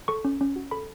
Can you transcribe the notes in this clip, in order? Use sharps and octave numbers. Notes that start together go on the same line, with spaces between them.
A4 C#6
C#4
C#4
F#4
A4 B5